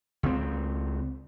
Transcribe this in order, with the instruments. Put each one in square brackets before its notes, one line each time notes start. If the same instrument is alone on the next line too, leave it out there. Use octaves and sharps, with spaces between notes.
[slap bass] C#2 C4